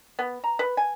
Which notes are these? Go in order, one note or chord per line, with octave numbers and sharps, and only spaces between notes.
B3
A#5
B4
G#5